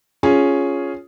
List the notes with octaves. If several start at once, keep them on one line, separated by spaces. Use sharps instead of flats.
C#4 F4 G#4